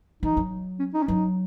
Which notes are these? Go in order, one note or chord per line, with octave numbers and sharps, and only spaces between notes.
E3 D#4
F#3
C#4
D#4
C#4
F#3 D#4